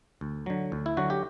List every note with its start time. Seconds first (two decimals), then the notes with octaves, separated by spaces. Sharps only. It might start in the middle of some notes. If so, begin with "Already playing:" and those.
0.21 D2
0.46 D3 F#3
0.72 D2
0.86 E4
0.97 D3 F#3 F#4
1.10 G4